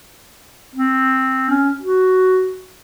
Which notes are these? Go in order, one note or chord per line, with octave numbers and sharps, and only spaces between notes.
C4
C#4
F#4